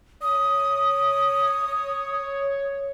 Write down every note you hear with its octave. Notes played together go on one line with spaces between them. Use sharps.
C#5 D#6